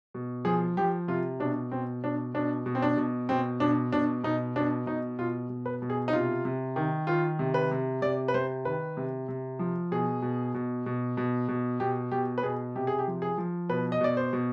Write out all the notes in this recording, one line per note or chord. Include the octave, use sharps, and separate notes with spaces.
B2
F3 G#4
F3 G4
C3 F4
B2 D4
B2 C4
B2 D4
B2 D4
B2
C4
D4
B2
B2 C4
B2 D4
B2 D4
B2 D#4
B2 D4
B2 D#4
B2 F4
B2
B4
B2
G#4
D#4
C3 F4
C3
D#3
D#3 F4
C3
B4
C3
C3 D5
B4
C3 C5
D#3 B4
C3
C3
F3
B2 G#4
B2
B2
B2
B2
B2
B2 G4
B2 G4
B4
B2 G#4
C3 G4
G#4
G4
F3
G#4
F3
B2 B4
D#5
B2 D5
C5
B2